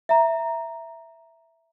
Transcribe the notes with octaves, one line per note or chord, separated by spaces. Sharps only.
E5 A#5